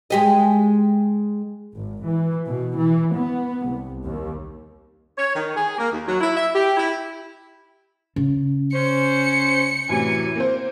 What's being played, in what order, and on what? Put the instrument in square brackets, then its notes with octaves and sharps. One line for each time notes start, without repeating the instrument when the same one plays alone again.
[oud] G#3 G4 D#5
[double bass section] G#1
E3
B2
E3
B3
C2
D#2
[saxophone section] C#5
D#3
G#4
A#3
D#2
F#3
E4
E5
G4
E4
[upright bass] C#3
[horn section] C#4 C5 [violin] C#7
[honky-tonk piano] F#2 A2 C3 [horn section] E3 G#5
[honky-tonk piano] A#3 C4 C5